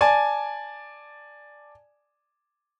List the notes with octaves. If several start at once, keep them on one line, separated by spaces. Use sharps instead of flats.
D5 G#5 A5